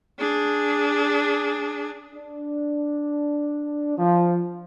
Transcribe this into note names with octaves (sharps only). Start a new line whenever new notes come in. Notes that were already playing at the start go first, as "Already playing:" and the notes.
D4 G#4
D4
F3